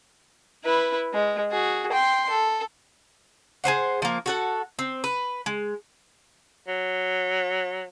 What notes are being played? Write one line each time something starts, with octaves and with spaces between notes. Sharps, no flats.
E4 B4
G#3
F#4 G#4
G5 C6
A4
G#4 B4 C5 F#5
F3 A#3
F#4 A4 F#5
C4
B4
G#3
F#3